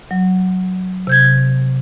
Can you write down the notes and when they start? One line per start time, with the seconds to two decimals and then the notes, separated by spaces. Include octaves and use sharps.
0.11 F#3
1.07 C3 G6 G#6